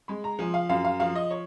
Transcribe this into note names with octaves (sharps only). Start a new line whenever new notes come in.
G#3 B5
A#5
F3 G#5
F5
F#2 F5
F5
F3 F5
D#5
C#5